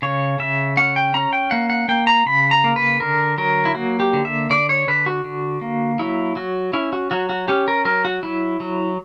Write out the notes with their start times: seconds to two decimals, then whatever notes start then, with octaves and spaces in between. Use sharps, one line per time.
0.02 C#3 C#5
0.39 C#3 E5
0.77 C#4 F#5
0.96 G5
1.14 C#4 A#5
1.33 G5
1.51 A#3 F#5
1.70 F#5
1.88 A#3 G5
2.07 A#5
2.26 C#3 B5
2.51 A#5
2.64 A#3
2.76 B4
3.00 D3 A#4
3.38 F#3 A#4
3.65 E4
3.75 A#3 F#4
4.00 G4
4.13 D3
4.25 E5
4.50 D3 D5
4.69 C#5
4.88 D3 B4
5.06 F#4
5.24 D3
5.61 A#3
5.99 F#3 E4
6.36 F#3 F#4
6.73 C#4 E4
6.93 F#4
7.11 F#3 F#4
7.29 F#4
7.48 C#4 G4
7.68 A#4
7.85 F#3 A#4
8.05 F#4
8.23 F#3 E4
8.60 F#3